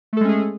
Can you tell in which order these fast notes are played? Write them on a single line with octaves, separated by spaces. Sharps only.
A3 A4 G#3 C#4 G#4